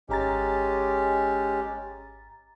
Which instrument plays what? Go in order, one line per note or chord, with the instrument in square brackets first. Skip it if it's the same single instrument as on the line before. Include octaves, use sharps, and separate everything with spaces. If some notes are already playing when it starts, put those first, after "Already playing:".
[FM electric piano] G#1 A#5 A6 [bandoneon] G#3 C#4 G4